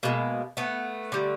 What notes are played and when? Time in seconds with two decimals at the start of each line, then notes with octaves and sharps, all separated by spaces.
0.03 B2 G#3 A#3
0.57 A3 B3
1.12 D3 G3